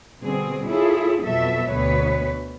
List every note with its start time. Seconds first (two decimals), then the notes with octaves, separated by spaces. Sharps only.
0.21 B2 D3 G3 C4 G#4
0.66 E4 F4 G#4 A4 C#5
1.22 F2 B2 F#3 A4 E5
1.70 D2 B2 B4 C#5